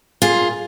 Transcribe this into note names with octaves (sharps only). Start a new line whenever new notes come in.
A#2 F4 G#4